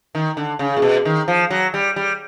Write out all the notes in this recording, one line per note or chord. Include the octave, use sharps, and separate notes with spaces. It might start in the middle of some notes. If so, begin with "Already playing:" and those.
D#3
D3
C#3
A#2
B2
D#3
F3
F#3
G3
G3